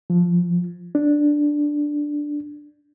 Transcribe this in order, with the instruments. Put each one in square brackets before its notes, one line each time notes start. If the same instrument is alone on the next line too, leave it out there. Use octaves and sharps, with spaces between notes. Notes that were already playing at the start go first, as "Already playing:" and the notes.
[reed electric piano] F3
D4